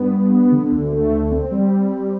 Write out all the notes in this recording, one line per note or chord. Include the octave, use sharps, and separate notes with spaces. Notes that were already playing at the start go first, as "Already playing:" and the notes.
Already playing: G2 B3
G2
B3
D3
D2
A3
D3
C4
G3
G3
G3